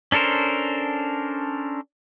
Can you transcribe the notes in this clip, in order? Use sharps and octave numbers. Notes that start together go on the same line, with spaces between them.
C#4 D4 A4 A#4 C5